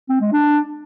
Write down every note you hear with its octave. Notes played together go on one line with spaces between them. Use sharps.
C4
G#3
D4